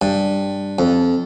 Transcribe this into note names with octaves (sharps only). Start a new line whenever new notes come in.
G2
F2